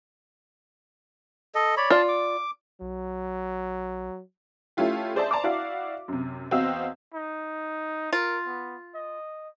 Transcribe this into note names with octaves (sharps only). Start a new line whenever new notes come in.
A4 D#5
C#5 D5 B5
F4 D5 A5 C6
D6
B1 F#3
A3 C#4 E4 F4 G4
G#4 C5 D5 E5 A5
D5 A5 A#5 C6 D6
E4 F#4 D5 F5
F#2 C3
E2 C4 F#4 D#5 F5 E6
D#4
F4 A#4
B3
D#5